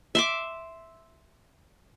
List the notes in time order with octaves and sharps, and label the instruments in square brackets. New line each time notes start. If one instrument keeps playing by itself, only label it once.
[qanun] E5 C6 D6